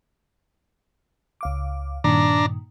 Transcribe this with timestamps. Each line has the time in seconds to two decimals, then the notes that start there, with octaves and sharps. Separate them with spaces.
1.41 C#2 F5 D6
2.04 G2 A#2 D#3 D4 A#5